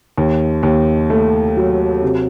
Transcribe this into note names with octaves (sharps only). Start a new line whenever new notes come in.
D#2
D#2
A3
F#3
C3